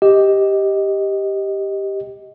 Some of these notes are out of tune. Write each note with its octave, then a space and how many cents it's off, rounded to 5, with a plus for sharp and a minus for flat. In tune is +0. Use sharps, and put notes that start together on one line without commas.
G4 +0 D#5 +10